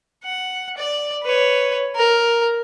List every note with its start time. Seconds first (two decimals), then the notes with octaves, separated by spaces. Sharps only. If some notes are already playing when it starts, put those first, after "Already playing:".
0.24 F#5
0.77 D5
1.23 B4 C#5
1.96 A#4